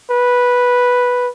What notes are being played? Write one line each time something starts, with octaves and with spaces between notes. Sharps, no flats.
B4